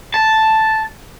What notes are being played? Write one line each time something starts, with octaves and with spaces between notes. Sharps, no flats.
A5